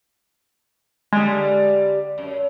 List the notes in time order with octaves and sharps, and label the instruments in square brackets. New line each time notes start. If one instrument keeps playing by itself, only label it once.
[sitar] D3 G3 [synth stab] G#3
[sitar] F#2